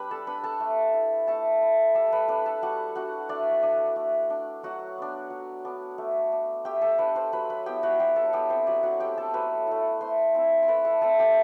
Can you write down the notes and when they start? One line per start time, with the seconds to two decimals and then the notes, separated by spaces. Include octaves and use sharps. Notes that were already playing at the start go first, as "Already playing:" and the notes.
Already playing: G3 D4 G4 B4 B5
0.11 A4 A5
0.27 D4 B4 B5
0.43 A4 A5
0.60 A3
0.94 E4
1.27 A3 A4 A5
1.62 E4
1.95 G3 A4 A5
2.12 B4 B5
2.28 D4 B4 B5
2.46 A4 A5
2.62 G3 F#4 F#5
2.95 D4 F#4 F#5
3.29 A3 D4 D5
3.62 D4
3.96 A3
4.30 D4
4.63 F#3 F#4 F#5
4.98 B3 D4
5.30 F#3
5.65 B3 D4
5.98 A3
6.32 D4
6.65 A3 G4 G5
6.82 A4 A5
6.98 D4 B4 B5
7.15 C5 C6
7.32 F#3 B4 B5
7.50 B4 B5
7.66 B3 E4 G4 G5
7.83 F#4 F#5
7.99 F#3 G4 G5
8.16 A4 A5
8.33 B3 E4 G4 G5
8.50 C4 C5
8.67 F#3 D4 D5
8.83 F#4 F#5
9.00 A3 E4 G4 G5
9.18 A4 A5
9.34 F#3 B4 B5
9.67 A3 E4
10.01 A3 C5 C6
10.34 C4 E4
10.63 C6
10.68 A3 B4 B5
10.85 A4 A5
11.01 C4 E4 A4 A5
11.19 G4 G5